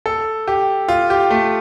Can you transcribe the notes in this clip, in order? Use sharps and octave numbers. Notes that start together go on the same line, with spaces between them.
A4
G4
F4
G4
A3